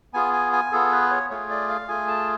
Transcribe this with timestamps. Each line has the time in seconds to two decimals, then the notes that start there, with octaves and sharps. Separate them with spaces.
0.14 B3 F4 G#4 G#5
0.33 G#5
0.53 G#5
0.72 B3 F4 G#4 A4
0.91 B4
1.10 C#5
1.30 A3 F4 G#4 C#5
1.50 D5
1.69 F5
1.88 A3 F4 G#4 G#5
2.08 A5